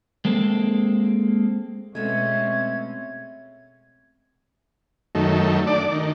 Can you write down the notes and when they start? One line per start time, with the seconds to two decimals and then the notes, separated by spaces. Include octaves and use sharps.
0.25 G#3 A#3 C4 A4
1.95 B2 G#3 A3 C4 C#4 G#6
5.15 F#2 D#3 A3
5.67 D4 D5
5.91 D#3